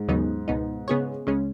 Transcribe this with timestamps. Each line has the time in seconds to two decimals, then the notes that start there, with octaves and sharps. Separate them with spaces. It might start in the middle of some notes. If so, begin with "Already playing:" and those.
Already playing: G#2
0.08 D#2 C#3 F#3 B3 D#4
0.48 C#2 B2 B3 D#4
0.88 C#3 B3 G#4 C#5
1.27 C#2 C#3 G#3 C#4